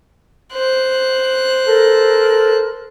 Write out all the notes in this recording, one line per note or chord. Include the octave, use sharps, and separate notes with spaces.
C5 F#6
A4 A#4